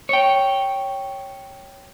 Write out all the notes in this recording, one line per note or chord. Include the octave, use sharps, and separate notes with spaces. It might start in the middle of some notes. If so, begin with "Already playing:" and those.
C#5 G5